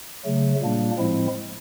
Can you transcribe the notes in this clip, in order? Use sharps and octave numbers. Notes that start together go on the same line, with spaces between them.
C#3 F#3 A3
A#2 G3 A#3 D4
A2 F3 G#3 C4 E4